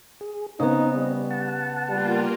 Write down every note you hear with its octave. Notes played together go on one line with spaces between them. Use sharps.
G#4
C#3 B3 C4 D#4 D#5
G3
F#5 A5
G3 A#3 F4